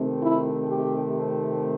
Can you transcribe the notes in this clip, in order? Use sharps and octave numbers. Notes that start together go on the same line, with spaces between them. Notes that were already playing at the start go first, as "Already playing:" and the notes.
Already playing: C3 D#3 A3 C4
E4
G4